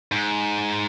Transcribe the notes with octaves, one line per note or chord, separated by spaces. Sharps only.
G#2